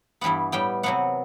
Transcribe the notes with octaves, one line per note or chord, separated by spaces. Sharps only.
G2 E3 G3 B3 F#5
A2 G3 B3 G5
C3 F#3 B3 F#5